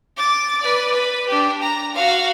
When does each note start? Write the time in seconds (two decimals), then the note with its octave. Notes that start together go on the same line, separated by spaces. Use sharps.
0.17 D6 A6
0.61 B4 D5
0.91 B4
1.28 D4 G4
1.62 A#5
1.94 F#4 F5